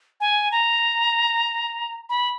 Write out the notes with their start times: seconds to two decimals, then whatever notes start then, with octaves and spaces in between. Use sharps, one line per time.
0.20 G#5
0.52 A#5
2.09 B5